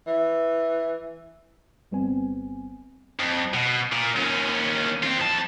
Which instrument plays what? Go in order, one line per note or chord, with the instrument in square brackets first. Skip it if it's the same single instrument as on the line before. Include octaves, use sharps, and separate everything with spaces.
[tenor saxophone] E3
[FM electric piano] G1 G3 B3 C4 G#5
[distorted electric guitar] F2
B2
A#2
D#2 C#4
C4 F4
F2 A5